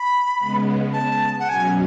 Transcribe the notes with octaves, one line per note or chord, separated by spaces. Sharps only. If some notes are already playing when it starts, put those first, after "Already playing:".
Already playing: B5
C#3 G#3 B3
A5
F#5
B2 F#3 C#4 G#5